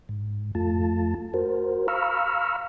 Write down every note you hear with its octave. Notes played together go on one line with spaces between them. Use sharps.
G#2
F2 A3 F4 A5
F#4 A#4 C5
F5 A#5 B5 C#6 E6 F6